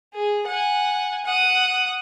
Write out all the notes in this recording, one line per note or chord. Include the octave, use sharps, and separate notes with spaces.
G#4
F#5 G#5
F#5 D#6